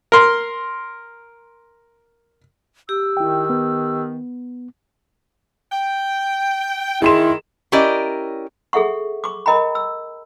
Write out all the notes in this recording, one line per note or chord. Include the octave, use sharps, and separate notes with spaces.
A#4 C6
G4 E6
D#3 E4 G5
B3
G5
D#3 E4 G#4 C6 E7
C#4 E4 G4 A#4 D5 D#5
G#4 A4 E5 F#5 C#6
C#6 D6
A#4 D#5 G5 A#5 B5
E6